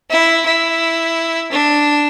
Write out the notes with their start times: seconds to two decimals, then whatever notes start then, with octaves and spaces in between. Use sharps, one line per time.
0.10 E4
0.46 E4
1.51 D4